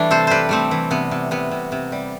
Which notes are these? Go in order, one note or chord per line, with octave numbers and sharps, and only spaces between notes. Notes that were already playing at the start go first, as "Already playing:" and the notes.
Already playing: E3 G3 A3 D4
C3 A4 C5
G3 G4 B4 C5
G3 A3 C4
E3
C3 B3
C3
C3 B3
C3
C3
G3